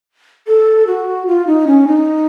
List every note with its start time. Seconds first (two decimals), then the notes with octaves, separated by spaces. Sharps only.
0.47 A4
0.87 F#4
1.27 F4
1.47 D#4
1.67 C#4
1.87 D#4